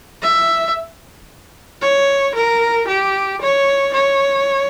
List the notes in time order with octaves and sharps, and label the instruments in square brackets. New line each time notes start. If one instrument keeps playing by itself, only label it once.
[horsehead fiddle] E5
C#5
A#4
G4
C#5
C#5